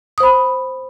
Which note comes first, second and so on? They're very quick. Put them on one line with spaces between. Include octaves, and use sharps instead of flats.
D#6 C5 B5